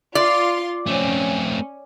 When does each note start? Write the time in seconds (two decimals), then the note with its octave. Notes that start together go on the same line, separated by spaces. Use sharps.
0.15 F4 D5 C6
0.87 A3 C4 C#4